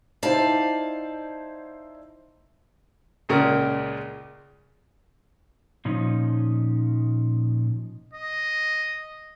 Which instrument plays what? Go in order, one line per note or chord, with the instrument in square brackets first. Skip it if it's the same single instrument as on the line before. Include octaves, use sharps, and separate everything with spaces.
[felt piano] D#4 E4 C5 [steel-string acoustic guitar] D5 F5 A5
[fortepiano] C#2 A#2 C#3 A#4
[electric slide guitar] A#2 F3 C#4 D#4
[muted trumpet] D#5